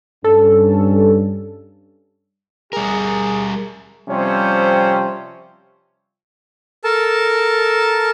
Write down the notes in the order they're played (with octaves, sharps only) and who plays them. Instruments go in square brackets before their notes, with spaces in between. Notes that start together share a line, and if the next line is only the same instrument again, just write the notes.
[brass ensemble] G2 C#4 [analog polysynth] A4
[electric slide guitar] G3 A#4 [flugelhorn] G#4
[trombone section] C3 F3 G3 C4 C#4 C5
[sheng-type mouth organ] A4 A#4 A5